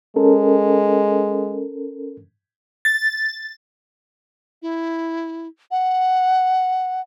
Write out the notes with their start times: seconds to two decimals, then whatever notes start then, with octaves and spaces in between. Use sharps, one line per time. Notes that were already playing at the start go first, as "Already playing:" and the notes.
0.16 G#3 C#4 A4 A#4
2.85 A6
4.62 E4
5.71 F#5